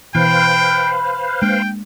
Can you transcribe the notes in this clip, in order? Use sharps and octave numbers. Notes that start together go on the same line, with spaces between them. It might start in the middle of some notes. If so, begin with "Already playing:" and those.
B2 E3 B4 C5 F5 G5 B5
G#3 A#3 D4 G5